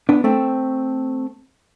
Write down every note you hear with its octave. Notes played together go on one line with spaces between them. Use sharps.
B3 D4
A3 C4